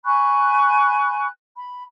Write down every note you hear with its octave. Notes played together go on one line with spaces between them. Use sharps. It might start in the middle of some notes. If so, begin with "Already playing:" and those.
G#5 B5 C#6 F#6
B5